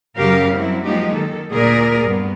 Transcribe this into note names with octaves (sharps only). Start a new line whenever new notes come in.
F#2 C#3 F#3 G4 A#4 F5
F#3 G3 C4 E4
F3 F#3 G#3 A#3 D#4 G4
D#3 A4
D2 A#2 G#4 A#4 D5
G2 B3